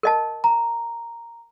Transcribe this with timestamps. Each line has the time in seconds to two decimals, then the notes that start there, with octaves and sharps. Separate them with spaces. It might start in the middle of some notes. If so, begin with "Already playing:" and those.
0.03 A#4 D#5 A5
0.44 A#5